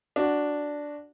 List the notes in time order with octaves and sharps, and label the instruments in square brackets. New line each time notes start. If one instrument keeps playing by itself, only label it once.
[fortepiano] D4 F#4